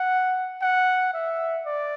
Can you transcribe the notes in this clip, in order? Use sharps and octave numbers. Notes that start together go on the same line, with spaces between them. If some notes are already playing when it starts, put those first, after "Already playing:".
Already playing: F#5
F#5
E5
D5